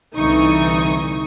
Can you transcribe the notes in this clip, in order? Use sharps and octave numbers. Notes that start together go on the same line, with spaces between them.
C2 D3 E3 D#4 C#6 D#6